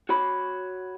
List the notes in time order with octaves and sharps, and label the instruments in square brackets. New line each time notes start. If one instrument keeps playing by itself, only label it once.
[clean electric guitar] F#4 C#5 B5